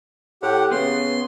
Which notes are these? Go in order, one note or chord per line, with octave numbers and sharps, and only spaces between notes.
A2 G4 F#5
C#3 B3 C6